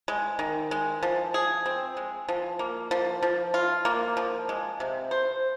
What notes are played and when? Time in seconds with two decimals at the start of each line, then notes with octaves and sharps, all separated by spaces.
0.08 G#3
0.39 D#3
0.71 G#3
1.03 F3
1.34 G#4
1.66 C4
1.97 G#3
2.29 F3
2.59 A#3
2.91 F3
3.23 F3
3.54 F4
3.85 A#3
4.17 F3
4.49 G#3
4.80 C3
5.11 C5